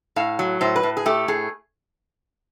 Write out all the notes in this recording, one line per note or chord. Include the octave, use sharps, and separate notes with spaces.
A2 F5
F#3
A2 C5
B4
A2
G#4
A3 G4
A2 G#4